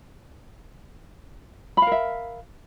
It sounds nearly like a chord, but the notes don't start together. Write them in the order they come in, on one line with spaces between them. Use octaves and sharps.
B5 F5 A#4 E5